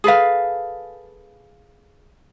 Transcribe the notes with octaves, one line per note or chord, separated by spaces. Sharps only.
G#4 A4 B4 F5